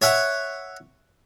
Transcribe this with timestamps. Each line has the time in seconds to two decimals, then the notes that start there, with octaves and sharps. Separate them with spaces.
0.02 C#5 E5 F#5